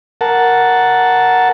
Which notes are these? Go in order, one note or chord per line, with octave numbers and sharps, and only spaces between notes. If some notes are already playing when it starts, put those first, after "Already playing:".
A#4 F#5 A5